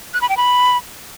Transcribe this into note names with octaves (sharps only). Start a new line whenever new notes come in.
F#6
B5
G5
B5